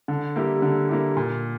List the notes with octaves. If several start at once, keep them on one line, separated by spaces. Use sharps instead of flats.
D3
G3 A#3 E4 G4
D3
G3 A#3 E4 G4
A#2